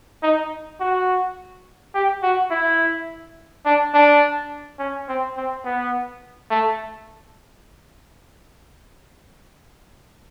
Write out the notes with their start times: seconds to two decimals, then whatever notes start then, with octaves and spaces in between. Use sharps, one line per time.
0.23 D#4
0.80 F#4
1.95 G4
2.23 F#4
2.51 E4
3.65 D4
3.94 D4
4.79 C#4
5.08 C4
5.37 C4
5.65 B3
6.51 A3